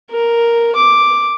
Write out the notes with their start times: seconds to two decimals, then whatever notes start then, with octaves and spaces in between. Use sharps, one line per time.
0.11 A#4
0.76 D6